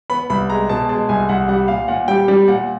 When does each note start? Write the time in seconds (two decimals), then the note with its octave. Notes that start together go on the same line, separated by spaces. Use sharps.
0.10 B3 B5
0.30 C2 B5
0.50 G#3 A#5
0.69 B2 A5
0.89 G#3 A5
1.09 C2 G#5
1.29 C2 F#5
1.48 G3 F#5
1.68 A#2 F5
1.88 A#2 F#5
2.08 G3 G5
2.28 G3 G5
2.48 A#2 F#5